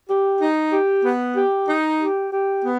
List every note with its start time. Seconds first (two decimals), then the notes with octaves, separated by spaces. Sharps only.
0.10 G4
0.42 D#4
0.73 G4
1.04 B3
1.36 G4
1.68 D#4
2.00 G4
2.33 G4
2.64 B3